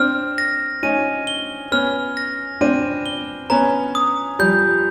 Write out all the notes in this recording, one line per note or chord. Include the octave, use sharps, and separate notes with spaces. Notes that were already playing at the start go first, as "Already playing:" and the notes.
Already playing: C4 D4 F6
A#6
C#4 D#4 D#7
G7
B3 C#4 F6
A#6
C4 D4 D#7
G7
B3 C#4 A#5
D#6
F3 G3 G6